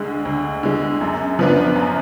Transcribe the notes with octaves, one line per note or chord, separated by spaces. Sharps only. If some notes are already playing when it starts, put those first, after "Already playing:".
Already playing: D2 D3 G#3
D2
D3 G#3
F#2
F3 B3 D4
F#2